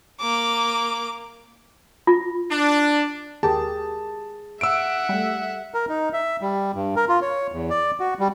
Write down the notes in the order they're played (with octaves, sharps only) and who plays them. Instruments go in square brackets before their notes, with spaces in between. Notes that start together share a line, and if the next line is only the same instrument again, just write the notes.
[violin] A#3 D6
[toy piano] F4
[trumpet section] D4
[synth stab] D#2 G4 A#4 [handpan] G#4 [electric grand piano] A5
[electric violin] E5 F#5 [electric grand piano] E6 D7
[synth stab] G3 A3
[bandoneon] A#4
D#4
E5
G3
G2
A#4
F4
C#5
E2
D5
F#4
G3